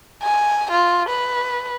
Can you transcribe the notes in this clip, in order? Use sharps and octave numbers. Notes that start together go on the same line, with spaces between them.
G#5
F4
B4